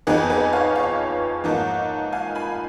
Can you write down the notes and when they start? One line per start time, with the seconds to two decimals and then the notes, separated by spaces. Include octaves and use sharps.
0.07 F2 F3 B3 D#4 G#4 B4
0.30 G#4 B4
0.53 C#5 F5
0.76 C#5 F5
1.44 G#2 F3 A#3 D#4
2.13 F5 G#5
2.35 G#5 B5